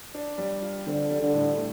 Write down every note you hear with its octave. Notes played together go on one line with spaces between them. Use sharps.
D4
G3
F4
D3 C4
G3
D3
A2
A3